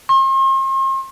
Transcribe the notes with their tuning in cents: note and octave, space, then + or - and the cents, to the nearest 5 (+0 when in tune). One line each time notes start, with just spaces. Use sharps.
C6 +45